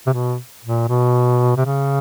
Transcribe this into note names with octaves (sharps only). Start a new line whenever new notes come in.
C3
B2
A#2
B2
C3
C#3